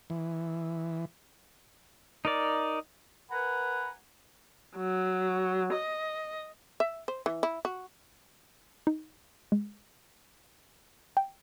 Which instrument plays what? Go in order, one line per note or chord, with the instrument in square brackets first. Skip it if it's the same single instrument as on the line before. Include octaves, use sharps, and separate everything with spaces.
[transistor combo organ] E3
[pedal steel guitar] D#4 A#4 D5
[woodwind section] A#4 B4 F#5 G#5 A#5 B5
[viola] F#3
D#5
[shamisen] E5
C5
E3
E4
F#4
[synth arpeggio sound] D#4
G#3
G5